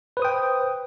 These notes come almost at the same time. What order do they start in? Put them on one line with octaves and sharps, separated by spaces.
B4 C5 D#6 G5